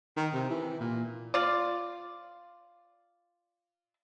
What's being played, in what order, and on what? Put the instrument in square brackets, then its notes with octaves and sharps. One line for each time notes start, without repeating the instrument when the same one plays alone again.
[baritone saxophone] D#3
C3
E3
A#2
[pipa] F4 D5